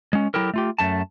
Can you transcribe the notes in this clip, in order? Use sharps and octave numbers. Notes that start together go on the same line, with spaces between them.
G#3 C#4
F#3 E4 G4 A4 A#4
A3 F4 G4
F#2 A3 A5